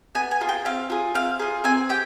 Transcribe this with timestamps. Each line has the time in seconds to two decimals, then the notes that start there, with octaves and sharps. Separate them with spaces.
0.15 B3 G#5
0.31 G#5
0.40 F4 G#4
0.49 G5
0.65 C4 F5
0.90 F4 G#4
1.15 C4 F5
1.39 F4 G#4
1.64 C4 G#5
1.89 G4 G5